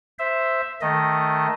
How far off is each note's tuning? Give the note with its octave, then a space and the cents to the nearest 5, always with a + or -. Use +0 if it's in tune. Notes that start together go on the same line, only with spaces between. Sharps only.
C5 +0 E5 +0
D#3 +0 A3 +0 D#5 +0